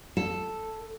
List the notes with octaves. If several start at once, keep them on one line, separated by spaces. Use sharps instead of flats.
A4